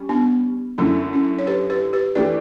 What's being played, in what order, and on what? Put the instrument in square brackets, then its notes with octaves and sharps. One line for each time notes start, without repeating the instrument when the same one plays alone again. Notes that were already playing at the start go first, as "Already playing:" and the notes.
Already playing: [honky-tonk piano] G3 C#4
[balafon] B3 D4
[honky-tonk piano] F#2 D3 A3 E4 [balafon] C#4
[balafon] C#4
C#5
G4 B4
G4 B4
G4 B4
[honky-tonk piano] E3 A3 D4 G4 [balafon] B4 D5